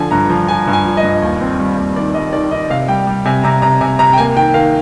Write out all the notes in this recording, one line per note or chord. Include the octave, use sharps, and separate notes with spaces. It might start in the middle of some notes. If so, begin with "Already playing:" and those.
Already playing: D3 F3 G#5
G2 A#5
F3
F3 G#5
G2
G#5
F3
D#5
G2
D#2
C4
G3
D#2
D#3 D5
G3 D#5
D#3 D5
D#3 D#5
C3 F5
G3 G5
G3
C3 G#5
C3 A#5
C3 A#5
C3 G#5
C3 A#5
G5
A#3 G#5
D#3 G5
D#3 F5